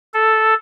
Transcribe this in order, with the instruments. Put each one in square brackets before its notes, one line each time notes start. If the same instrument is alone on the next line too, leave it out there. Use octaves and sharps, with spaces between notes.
[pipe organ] A4